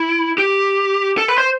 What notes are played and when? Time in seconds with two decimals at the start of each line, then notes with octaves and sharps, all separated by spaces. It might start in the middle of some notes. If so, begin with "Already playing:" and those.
Already playing: E4
0.38 G4
1.18 A4
1.28 B4
1.38 C5